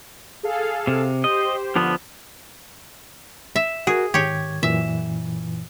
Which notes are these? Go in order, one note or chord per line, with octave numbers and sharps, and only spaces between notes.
G#4 A4 F5
C3
G4 C5 D#5
D3 F3 B3
E5
F#4 G#4 A#4
G#2 D#3 G4 C#5 G#6
F#2 A#2 E3 E5